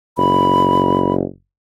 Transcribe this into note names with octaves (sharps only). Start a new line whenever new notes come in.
F#1 B5